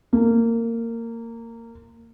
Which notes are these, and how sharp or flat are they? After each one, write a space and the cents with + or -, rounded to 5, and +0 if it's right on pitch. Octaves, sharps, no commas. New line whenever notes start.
A#3 -20